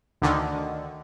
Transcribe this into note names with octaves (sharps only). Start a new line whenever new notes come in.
D2 D3 D#3